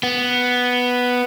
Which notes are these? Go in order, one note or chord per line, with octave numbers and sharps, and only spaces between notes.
B3